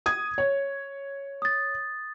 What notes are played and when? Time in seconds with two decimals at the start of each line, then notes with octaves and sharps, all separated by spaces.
0.06 D#6 G#6
0.38 C#5
1.42 D#6 A6